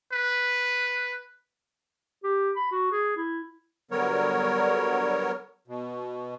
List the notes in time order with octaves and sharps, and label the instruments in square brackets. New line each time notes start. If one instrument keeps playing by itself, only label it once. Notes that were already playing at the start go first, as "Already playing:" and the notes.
[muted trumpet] B4
[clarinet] G4
B5
F#4
G#4
E4
[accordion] D3 F#3 G3 B3 A#4 C#5
B2